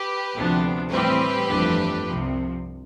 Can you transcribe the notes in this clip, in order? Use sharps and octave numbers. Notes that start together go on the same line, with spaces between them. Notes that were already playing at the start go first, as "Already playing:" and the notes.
Already playing: G4 B4
D2 C3 F3 B3 D4
A2 E3 G3 C4 G4 B4
G1 F2 E3 A3 D4
C2 C3 F3